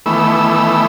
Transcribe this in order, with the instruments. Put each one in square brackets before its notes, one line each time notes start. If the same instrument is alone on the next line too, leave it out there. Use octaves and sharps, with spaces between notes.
[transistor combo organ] D#3 E3 A3 B3 B5 E6